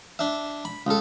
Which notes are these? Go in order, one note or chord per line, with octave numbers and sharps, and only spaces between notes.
D4 E5
B5
C#2 A4